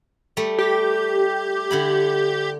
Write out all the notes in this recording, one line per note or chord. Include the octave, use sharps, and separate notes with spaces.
G3 A3
G4
D3 E4 B5